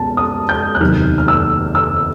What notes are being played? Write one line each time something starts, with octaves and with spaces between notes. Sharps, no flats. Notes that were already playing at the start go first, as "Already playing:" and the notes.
Already playing: C#2 B2 G#3 A5
D#6
G6
F#6
F1 D#2 D#3 F#3 B3 F6
F6
E6
E6